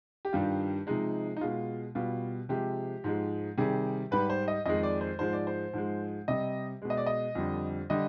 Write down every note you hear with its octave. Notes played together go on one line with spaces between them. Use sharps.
G4
G2 D#3 G3 F4
C3 F3 G#3 D#4
D#4
B2 G#3 F4
B2 G3 F4
C3 F3 G#3 G4
G#2 F3 G#3
C3 D#3 G3 G#4
G#2 G3 B4
C5
D#5
F2 D#3 G#3 D#5
D5
C5
G#2 F3 G#3 C5
D5
C5
G#2 F3 G#3
C3 G3 D#5
B2 G#3
D#5
D5
D#5
F2 D3 G3
D3 G3 D#5